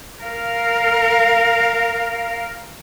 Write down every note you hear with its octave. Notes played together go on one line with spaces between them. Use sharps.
A#4 F5